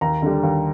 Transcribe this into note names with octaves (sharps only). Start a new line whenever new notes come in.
D#2 A#5
D3 G3
D#2